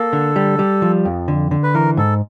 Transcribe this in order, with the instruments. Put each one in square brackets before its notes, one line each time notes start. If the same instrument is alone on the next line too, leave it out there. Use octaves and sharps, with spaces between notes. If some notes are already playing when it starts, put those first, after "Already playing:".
Already playing: [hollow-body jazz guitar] A#3 [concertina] A4
[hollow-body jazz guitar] D3
G3
G3
F3
F2
D3
D3
[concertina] B4
[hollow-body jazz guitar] E3 [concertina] A#4
[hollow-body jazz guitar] G#2 [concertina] A4